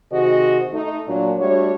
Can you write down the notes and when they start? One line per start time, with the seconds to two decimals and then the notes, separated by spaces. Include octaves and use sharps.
0.12 C3 D#3 F#4 G#4 C5 D#5
0.73 A3 D#4
1.07 A#2 F#3 D4
1.38 G3 A3 D4 F#4 C#5